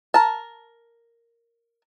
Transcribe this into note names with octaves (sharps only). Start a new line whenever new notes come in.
A#4 A5